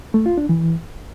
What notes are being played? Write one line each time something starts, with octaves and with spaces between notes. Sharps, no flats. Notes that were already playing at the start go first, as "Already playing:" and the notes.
A3
F4
D4
E3